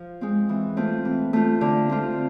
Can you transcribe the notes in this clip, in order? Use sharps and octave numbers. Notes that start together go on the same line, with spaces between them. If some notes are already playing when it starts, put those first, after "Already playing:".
Already playing: F3
G#3 C4
E3
A3 C4 F4
E3
A3 C4 F4
D3
A3 C4 F4